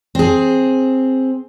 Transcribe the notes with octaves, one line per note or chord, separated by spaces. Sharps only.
C4 G#4